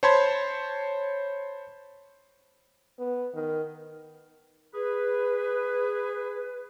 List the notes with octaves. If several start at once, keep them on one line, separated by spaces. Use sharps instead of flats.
C5 C#5 A5 B5 C6 G#6
B3
D#3
G#4 B4